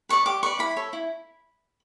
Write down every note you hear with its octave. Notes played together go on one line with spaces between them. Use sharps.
B4 D5 C#6
G4 D6
B4 D5 C#6
E4 B5
A4 C#5
E4